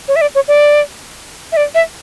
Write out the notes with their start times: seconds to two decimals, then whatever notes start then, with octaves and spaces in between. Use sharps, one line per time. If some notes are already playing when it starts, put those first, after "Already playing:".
0.08 C#5
0.16 E5
0.21 D5
0.35 C#5
0.48 D5
1.52 E5
1.57 D5
1.75 E5